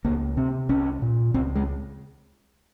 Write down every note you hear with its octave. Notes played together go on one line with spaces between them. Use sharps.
C#2 A#3
C3 C4
C2 C#4
A#2
C#2 C4
G#3